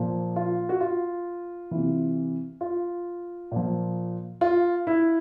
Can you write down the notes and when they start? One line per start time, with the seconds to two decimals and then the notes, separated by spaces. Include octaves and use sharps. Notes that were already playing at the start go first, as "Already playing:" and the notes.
Already playing: A#2 F3
0.36 F4
0.69 F#4
0.81 F4
1.71 C3 E3
2.61 F4
3.51 A#2 F3
4.41 F4
4.87 E4